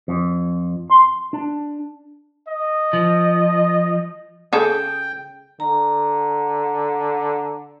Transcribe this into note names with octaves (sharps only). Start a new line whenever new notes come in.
F2
C6
D4
D#5
F3
C#3 G#4 A4 G5
D3 A#5